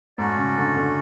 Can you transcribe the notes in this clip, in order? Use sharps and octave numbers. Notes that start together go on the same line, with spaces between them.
G#2 A3 C#4 F#4 A4 D5
C#3
D3
D3